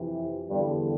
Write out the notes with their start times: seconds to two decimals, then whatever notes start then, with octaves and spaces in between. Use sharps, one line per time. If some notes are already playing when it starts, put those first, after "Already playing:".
Already playing: F2 C3 E3
0.49 E2 G2 D3 G3